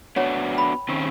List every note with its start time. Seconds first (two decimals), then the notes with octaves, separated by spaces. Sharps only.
0.16 B3 D4 F#4 C#5 F#5
0.55 G5 B5
0.89 D#3 C4 C#4